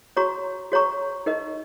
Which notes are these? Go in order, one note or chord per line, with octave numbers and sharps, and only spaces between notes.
F#4 C#5 A#5 C#6
F#4 C#5 A#5 C#6
D#4 A#4 D#5